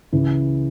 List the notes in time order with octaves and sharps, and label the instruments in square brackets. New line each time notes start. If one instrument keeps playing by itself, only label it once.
[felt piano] C#2 C#3 E3